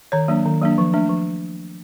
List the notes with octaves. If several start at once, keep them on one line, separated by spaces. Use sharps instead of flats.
D#3 C#5
F#3 A#3 D4
D#3
F#3 A#3 D4
F3
A3 D4
F3